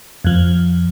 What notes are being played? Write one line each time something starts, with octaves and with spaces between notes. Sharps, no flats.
F2 F3